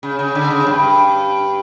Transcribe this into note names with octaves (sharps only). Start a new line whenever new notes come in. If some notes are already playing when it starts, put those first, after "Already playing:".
C#3
C#3
D3
C#3
G2